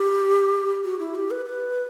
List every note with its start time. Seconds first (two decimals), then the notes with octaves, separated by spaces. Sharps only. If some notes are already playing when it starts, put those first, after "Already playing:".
Already playing: G4
0.84 F#4
0.99 E4
1.15 G4
1.31 B4
1.46 B4